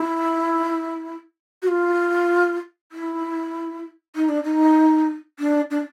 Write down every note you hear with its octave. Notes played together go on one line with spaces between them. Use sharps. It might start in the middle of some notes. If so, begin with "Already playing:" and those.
Already playing: E4
F#4
F4
E4
D#4
D4
D#4
D4
D4